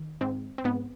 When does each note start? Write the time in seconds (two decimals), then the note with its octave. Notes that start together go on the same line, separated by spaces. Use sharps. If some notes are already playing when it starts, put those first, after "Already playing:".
Already playing: D#3
0.21 G#2 C4
0.58 C4
0.64 G#2 B3